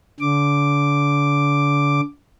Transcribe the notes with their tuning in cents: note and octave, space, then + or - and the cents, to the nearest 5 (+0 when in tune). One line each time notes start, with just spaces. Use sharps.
D3 -35 D6 +0